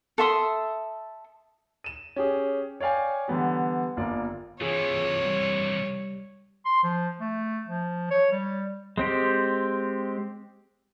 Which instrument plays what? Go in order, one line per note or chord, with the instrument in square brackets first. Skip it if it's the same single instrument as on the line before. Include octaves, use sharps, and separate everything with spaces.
[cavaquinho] A4 E5 C6 D#6
[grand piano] D#7 E7
C#4 G4 G#4
C#5 D5 F5 G5 G#5
D3 E3 G3 B3 G4
G1 A#3 F4 D5
[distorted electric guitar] C3 E3 [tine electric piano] F4 G#4 [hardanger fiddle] C#5
[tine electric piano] G3
[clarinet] C6
F3
A3
F3
C#5
G3
[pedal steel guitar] G#3 C4 G4